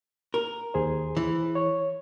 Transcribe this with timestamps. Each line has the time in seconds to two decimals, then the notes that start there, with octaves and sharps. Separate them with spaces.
0.34 A#4
0.74 D#2 G#4 C5
1.17 E3
1.55 C#5